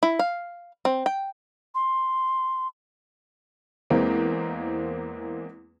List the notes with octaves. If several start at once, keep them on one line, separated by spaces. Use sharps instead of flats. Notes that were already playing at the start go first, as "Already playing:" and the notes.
E4
F5
C4
G5
C6
E2 E3 G#3 A#3 C4